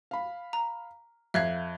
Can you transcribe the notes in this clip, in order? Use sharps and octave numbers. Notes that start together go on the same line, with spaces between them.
F5 B5
A#5
F2 E5 F5 F#6 G#6